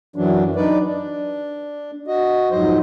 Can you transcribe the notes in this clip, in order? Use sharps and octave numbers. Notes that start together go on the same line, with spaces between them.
F#2 E3 F#3 D4
D4 D#4 B4 D5
D4
F#4 D#5
F2 G#2 F#3 C5 D#5